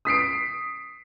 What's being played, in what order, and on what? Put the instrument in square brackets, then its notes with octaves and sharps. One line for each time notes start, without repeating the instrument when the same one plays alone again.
[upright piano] D#6 B6 C7 D7